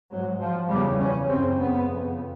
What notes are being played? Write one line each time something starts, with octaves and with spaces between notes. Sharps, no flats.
G#2 F#3
F3
E2 C#3 G3
C#4
F#2 C#3 C4
B3
F2 C#3